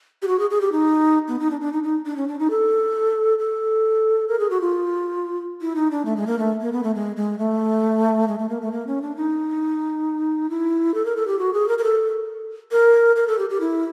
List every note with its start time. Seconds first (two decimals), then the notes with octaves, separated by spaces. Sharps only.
0.22 G4
0.28 F#4
0.40 G#4
0.50 G#4
0.61 G4
0.72 D#4
1.28 B3
1.39 D#4
1.51 D4
1.61 D4
1.73 D#4
1.83 D#4
2.06 D4
2.17 C#4
2.28 D4
2.39 D#4
2.50 A4
3.39 A4
4.28 A#4
4.39 G#4
4.50 F#4
4.61 F4
5.61 E4
5.76 D#4
5.91 D4
6.05 A3
6.16 G#3
6.27 A#3
6.39 A3
6.61 A#3
6.72 B3
6.83 A3
6.95 G#3
7.16 G#3
7.39 A3
8.28 G#3
8.39 A3
8.49 A#3
8.62 A3
8.72 A#3
8.87 C#4
9.02 D4
9.16 D#4
10.50 E4
10.94 A4
11.05 A#4
11.16 A4
11.27 G4
11.39 F#4
11.53 G#4
11.68 A#4
11.78 A#4
11.84 A4
12.72 A#4
13.16 A#4
13.28 A4
13.39 G4
13.50 G4
13.61 E4